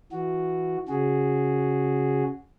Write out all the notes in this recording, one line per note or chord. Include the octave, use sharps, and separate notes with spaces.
E3 F#4
C#3 F#4 G#4